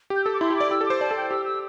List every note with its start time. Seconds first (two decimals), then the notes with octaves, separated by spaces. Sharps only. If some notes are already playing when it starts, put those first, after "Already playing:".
0.10 G4
0.16 G6
0.24 A4 E6
0.33 D6
0.40 E4 C6
0.50 G4
0.56 D5 D6
0.71 G4 E6
0.81 A4
0.86 C5 D6
1.01 D5 A5
1.11 A4
1.16 G5
1.31 G4 E6
1.45 E6